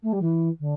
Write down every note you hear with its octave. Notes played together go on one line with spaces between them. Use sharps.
A3
G3
E3
D3